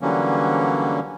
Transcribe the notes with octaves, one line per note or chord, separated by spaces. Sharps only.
D3 E3 F#3 G3 A#3 C#4